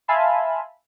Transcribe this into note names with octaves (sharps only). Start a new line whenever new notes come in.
E5 F5 G#5 A5 B5 C6